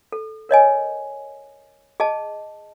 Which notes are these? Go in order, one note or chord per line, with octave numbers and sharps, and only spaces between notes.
A4
A#4 C#5 D#5 G#5
G#4 D#5 A5